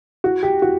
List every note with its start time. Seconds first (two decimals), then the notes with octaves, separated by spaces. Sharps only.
0.24 F#4
0.43 G4
0.62 F#4